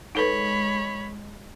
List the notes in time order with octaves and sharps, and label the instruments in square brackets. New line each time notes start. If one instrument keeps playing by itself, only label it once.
[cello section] G#3 [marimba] D#4 A4 B4 [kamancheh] C#5 B5